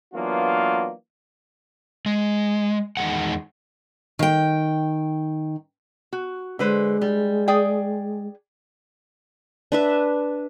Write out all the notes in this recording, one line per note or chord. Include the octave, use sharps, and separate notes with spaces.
E3 F#3 A#3 B3 D4 F4
G#3
E2 D#3 G3 G#3 F#5
D#3 G5
F#4
D3 G#3 B4 C5
G3
G#4 D5 G5
D4 B4 E5